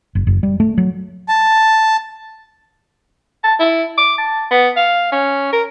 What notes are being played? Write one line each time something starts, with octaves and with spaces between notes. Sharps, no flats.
F#1
F#1
G3
A3
F#3
A5
A5
E4
D6
A5
B3
F5
C#4
A#4